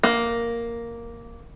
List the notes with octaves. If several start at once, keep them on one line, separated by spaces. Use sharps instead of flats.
A#3